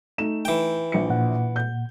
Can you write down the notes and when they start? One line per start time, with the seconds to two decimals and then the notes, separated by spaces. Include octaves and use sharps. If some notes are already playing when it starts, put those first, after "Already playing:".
0.18 A3 D#4 E7
0.45 E3 G5
0.92 A#1 C#7
1.10 A#2 F#5
1.56 G6